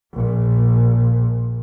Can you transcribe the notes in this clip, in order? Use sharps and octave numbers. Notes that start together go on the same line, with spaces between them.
A#1 A#2